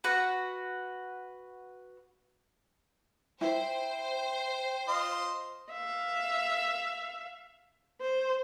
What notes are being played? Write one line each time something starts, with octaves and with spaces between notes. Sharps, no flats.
F#4 B4 F#5
E4 C5 G5
F4 D#5 C6
E5 F5
C5